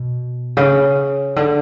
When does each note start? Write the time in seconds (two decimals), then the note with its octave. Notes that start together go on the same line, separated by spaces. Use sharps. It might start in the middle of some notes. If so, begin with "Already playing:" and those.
Already playing: B2
0.57 C#3
1.36 D3